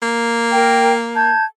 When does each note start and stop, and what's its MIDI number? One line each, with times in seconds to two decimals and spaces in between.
0.02 1.32 58
0.51 0.93 70
0.51 0.93 79
1.16 1.44 81
1.16 1.44 91
1.16 1.44 92